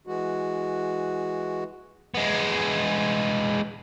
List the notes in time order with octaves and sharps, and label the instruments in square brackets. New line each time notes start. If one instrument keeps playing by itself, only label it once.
[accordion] E3 G#3 F#4
[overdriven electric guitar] G#3 B3